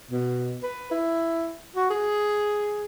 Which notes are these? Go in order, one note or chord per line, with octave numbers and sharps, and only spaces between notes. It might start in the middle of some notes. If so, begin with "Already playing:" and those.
B2
B4
E4
F#4
G#4